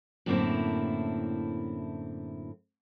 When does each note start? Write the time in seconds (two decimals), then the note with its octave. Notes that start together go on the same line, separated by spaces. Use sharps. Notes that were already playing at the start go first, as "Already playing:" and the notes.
0.26 F#2 A2 D3 A#3 C4 E4